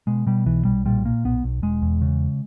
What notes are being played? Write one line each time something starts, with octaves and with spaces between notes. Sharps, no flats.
B2 G#3
B2 G3
B1 E3
B1 G3
A#2 G3
A#2 A#3
B1 B3
B1
E1 G#3
E2
C#3